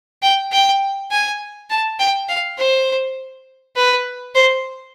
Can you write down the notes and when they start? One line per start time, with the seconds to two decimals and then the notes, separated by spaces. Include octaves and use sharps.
0.22 G5
0.52 G5
1.11 G#5
1.70 A5
1.99 G5
2.29 F5
2.58 C5
3.76 B4
4.35 C5